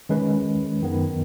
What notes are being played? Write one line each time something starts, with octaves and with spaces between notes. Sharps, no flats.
D#3 G#3 C#4 B4
F#2 D#3 B3